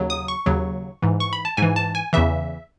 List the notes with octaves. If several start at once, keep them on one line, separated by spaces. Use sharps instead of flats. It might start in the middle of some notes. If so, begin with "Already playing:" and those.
Already playing: D#2 C#3 F#3
D#6
C#6
D#2 C#3 F#3
G#2 E3
C#6
B5
A5
G#2 E3 G#5
A5
G#5
E2 C#3 E3 E5